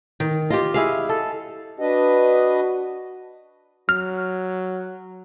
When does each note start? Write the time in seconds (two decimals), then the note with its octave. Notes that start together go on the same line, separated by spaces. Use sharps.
0.20 D#3
0.50 F4 G4 D#5
0.74 E4 G#4 F5
1.09 A4
1.80 D4 F#4 B4 D#5
3.89 F#3 F6